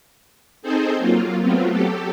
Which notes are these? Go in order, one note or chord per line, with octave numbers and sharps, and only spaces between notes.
C4 D#4 G#4 A4 C5
F#3 A#3 F4
F#3 A3 B3 C4 F4
F#3 G4 A4